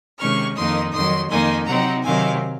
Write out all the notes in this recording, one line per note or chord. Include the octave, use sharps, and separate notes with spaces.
C3 D#3 G#3 C#4 C#6 F6
F2 D#3 A#3 D#4 C6 D#6
F2 D#3 F#3 C6 D#6
F2 D#3 A#3 D#4 G#5 C6
C3 F#3 C4 D#4 F#5 A#5
C3 D#3 F#3 C4 F5 G#5